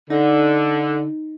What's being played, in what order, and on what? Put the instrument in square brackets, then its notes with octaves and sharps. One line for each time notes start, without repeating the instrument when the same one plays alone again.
[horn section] D3 [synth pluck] D#4